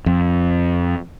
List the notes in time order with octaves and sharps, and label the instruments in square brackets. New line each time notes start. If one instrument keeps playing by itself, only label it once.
[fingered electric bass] F2